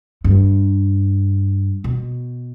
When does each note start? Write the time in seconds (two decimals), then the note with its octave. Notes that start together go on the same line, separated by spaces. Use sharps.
0.24 G2
1.84 B2